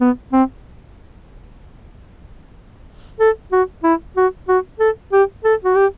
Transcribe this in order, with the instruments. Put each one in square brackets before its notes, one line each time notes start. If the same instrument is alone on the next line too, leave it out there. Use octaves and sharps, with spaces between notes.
[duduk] B3
C4
A4
F#4
E4
F#4
F#4
A4
G4
A4
F#4
G4